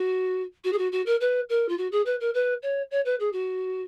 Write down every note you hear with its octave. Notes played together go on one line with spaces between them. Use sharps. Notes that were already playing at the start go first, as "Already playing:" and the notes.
Already playing: F#4
F#4
G#4
F#4
F#4
A#4
B4
A#4
F4
F#4
G#4
B4
A#4
B4
C#5
C#5
B4
G#4
F#4